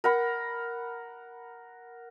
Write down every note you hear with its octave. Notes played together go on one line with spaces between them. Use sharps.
A#4 F#5 B5